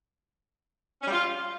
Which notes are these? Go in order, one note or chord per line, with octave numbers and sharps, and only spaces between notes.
C#4
G3
F4